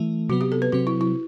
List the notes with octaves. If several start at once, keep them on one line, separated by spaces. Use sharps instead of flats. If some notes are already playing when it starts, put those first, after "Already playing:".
Already playing: E3 A3 E4
C3 F#3 B3 F#4
G4
A4
B4
C3 F#3 C4 F#4
E4
E4